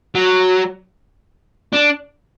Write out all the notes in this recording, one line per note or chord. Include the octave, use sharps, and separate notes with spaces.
F#3
D4